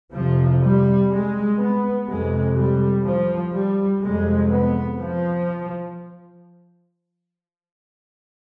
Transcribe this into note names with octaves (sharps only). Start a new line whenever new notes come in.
F2 C3 F3
G3
G#3
B3
F2 C3 G#3
G3
F3
G3
F2 C3 G#3
B3
F3